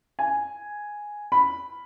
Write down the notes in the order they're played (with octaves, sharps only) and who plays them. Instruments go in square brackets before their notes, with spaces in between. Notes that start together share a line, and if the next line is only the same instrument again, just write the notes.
[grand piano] G#5
B5